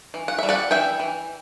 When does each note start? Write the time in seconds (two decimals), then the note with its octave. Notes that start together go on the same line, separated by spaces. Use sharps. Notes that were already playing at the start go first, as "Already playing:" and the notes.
0.14 E3
0.28 F#5
0.38 G3 E5
0.49 D5 F#5
0.71 E3 E5 G5
1.00 E3